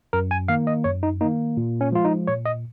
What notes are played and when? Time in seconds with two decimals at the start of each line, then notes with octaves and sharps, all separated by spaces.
0.13 F#2 A#4
0.31 G#5
0.48 D#3 A#3 F5
0.67 D#5
0.84 F#2 C#5
1.03 D#4
1.21 D#3 A#3 D#4
1.57 A#2
1.81 C#4
1.92 F3 G#3 F4
2.05 D#4
2.27 A#2 C#5
2.45 D#5